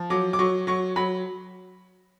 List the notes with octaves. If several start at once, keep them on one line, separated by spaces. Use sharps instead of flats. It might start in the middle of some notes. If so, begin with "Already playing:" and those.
Already playing: F3
F#3 D6
D6
F#3 C#6
F#3 C#6
F#3 B5